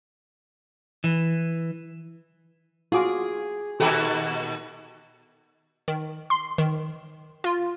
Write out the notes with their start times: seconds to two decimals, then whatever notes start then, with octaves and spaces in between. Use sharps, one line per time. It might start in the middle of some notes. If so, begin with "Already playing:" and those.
1.04 E3
2.92 F4 F#4 G#4 D6
3.80 A#2 D#3 F#4 G4 A4
5.88 D#3
6.30 C6
6.58 D#3
7.44 F4